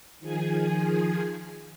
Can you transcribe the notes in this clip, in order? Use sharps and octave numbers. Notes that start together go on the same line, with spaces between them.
D#3 F3 G#4 G#5